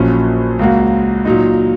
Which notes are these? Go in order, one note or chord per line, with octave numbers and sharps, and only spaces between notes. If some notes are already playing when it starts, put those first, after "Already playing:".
Already playing: A#1 A#2 F#3 C#4
C#2 C#3 A#3 F#4
A#2 F#3 D#4